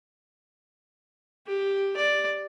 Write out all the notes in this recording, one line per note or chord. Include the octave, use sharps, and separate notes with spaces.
G4
D5